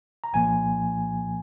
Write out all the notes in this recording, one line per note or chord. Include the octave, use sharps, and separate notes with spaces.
A#5
C2 A#2 F3 A#3 G#5